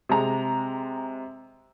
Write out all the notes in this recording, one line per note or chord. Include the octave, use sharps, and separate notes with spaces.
C3 G#3 A#5